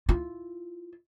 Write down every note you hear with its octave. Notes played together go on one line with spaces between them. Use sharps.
E4 F4